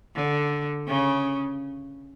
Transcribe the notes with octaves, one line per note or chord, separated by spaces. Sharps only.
D3
C#3